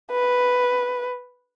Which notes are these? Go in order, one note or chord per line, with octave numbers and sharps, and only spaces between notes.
B4